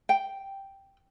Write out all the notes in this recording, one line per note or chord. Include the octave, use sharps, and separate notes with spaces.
G5